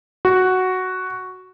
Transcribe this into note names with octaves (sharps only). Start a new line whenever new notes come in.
F#4